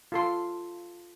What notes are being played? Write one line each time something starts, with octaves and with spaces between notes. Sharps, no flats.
F4 A4 C6